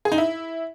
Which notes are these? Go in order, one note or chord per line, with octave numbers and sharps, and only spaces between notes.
G#4
D#4
E4